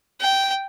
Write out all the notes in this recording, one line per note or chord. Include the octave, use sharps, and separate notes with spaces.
G5